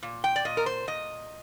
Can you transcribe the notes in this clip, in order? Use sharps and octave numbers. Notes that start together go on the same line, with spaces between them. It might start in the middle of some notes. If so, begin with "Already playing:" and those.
A#2
G5
D5
A#2 D#5
A#4
C5
A#2 D#5